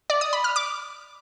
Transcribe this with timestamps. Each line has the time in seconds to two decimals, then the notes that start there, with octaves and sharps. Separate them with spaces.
0.10 D5
0.21 D#6
0.33 B5
0.44 F6
0.56 D6